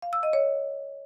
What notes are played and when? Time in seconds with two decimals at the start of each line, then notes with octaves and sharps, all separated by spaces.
0.02 F5
0.13 E6
0.23 D#5
0.33 C#5